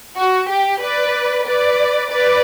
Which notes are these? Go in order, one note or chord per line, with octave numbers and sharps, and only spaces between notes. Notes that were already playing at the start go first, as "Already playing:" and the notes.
F#4
G4
B4 D5
B4 D5
B4 D5